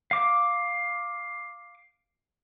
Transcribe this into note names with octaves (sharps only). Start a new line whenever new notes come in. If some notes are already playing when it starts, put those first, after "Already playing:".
F5 D6